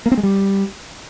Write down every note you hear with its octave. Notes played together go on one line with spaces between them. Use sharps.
A#3
C4
G#3
G3